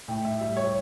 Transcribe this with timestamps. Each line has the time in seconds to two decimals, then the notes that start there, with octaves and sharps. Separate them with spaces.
0.08 A2 G5
0.25 E5
0.40 G3 E5
0.57 C#5